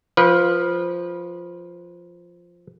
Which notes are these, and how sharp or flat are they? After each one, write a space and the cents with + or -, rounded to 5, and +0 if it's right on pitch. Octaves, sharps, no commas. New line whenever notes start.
F3 +0 B4 -20